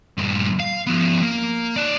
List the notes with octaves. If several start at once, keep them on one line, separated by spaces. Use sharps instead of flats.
G2 A#2
F5
F3 B3
A#3
D#4 D5